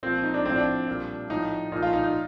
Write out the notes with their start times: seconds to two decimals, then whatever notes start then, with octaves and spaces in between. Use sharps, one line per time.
0.03 A#2 F3 C4
0.23 D#4
0.34 D4
0.45 A2 F3 C4
0.56 D4
0.87 A#2 G3
1.30 A2 F3 D#4
1.72 A#2 F3 D#4
1.83 F4
1.93 D#4
2.04 D#4